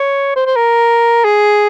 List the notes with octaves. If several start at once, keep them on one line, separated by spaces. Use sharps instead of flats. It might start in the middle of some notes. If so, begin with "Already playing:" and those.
Already playing: C#5
C5
C5
A#4
G#4